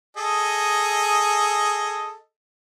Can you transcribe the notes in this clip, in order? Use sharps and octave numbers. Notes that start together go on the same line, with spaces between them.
G#4 A4 D#5